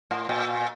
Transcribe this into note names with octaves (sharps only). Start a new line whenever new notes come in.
A2
A#2